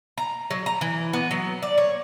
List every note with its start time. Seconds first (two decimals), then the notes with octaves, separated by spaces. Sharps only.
0.18 A#5
0.51 F#3
0.66 A#5
0.81 E3
1.13 B3
1.31 F#3
1.62 D5
1.78 C#5